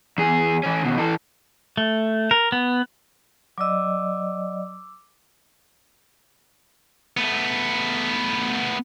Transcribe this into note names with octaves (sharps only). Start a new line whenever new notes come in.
E2 G#4
E3 C#4
D#2 B2
E3 A4
A3
A#4
B3
F#3 D5 D#5 D6 E6
A3 B3